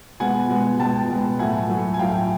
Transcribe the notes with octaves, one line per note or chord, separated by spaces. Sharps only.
B2 G#3 B3 F#5 G#5
B2 G#3 B3
B2 G#3 B3 G5 A5
B2 G#3 B3
A2 F#3 A3 F#5 G#5
A2 F#3 A3
G#5
A2 F#3 A3 F5 G5